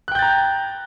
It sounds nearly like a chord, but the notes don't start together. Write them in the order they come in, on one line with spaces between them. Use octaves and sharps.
F#6 G5 G6 A6 A#5